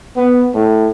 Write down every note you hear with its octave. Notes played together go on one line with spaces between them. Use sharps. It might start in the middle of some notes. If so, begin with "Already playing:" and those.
B3
A2